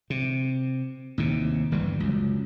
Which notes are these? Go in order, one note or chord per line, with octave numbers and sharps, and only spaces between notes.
C3
D#2 A2 C3
G1 E3 G3
C#2 F#2